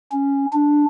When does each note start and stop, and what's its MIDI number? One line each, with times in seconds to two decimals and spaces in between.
0.12 0.46 61
0.53 0.85 62